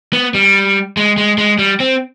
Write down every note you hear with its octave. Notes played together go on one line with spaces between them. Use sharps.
B3
G3
G#3
G#3
G#3
G3
C4